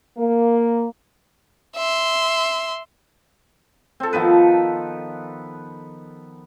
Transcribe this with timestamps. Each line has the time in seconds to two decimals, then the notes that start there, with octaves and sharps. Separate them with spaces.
0.18 A#3
1.77 E5 C6
4.00 C4 A4
4.13 D#3 F3 B3 B4